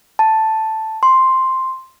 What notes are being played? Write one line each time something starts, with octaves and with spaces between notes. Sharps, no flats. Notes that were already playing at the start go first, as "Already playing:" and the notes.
A5
C6